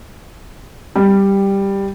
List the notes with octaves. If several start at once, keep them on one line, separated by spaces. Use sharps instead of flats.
G3